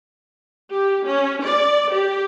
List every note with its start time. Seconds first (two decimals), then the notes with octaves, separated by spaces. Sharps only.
0.71 G4
1.07 C#4
1.42 D5
1.94 G4